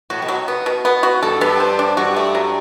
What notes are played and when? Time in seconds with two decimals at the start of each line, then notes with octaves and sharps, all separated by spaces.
0.10 A2 F#4
0.22 B2
0.28 F#3
0.48 B3
0.66 B2
0.85 B3
1.03 F#4
1.23 G2 A4
1.41 G2 B3
1.60 C5
1.79 D4
1.97 G2 F#4
2.16 A3
2.35 F#3